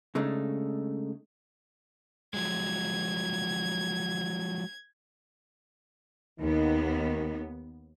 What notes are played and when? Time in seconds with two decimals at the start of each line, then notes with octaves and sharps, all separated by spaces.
0.15 C#3 G#3 A3 D4 D#4
2.34 F3 F#3 G#3 G#6
6.40 D#2 D#3 B3